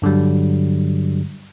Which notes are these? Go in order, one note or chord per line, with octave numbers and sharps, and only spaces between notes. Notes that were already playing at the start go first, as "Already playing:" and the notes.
G2 D3 F#3 G3